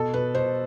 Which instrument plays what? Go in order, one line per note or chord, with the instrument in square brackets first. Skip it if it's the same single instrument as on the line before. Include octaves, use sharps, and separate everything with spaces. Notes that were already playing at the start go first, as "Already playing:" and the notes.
Already playing: [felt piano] B2 A4
B2 B4
B2 C5